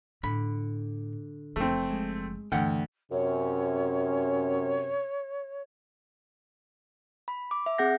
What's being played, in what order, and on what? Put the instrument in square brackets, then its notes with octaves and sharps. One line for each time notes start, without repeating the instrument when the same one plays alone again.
[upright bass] A2 [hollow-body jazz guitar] D3 B5
[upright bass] F#1 F3 [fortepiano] A3 C4
[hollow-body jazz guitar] G#3
[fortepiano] D2 [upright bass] G2 [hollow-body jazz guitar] E3 F#5 G5
[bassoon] F#2 [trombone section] C3 C#4 [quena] C#5
[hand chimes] B5
D6
E5
C4 G#4 F#5 G6 A#6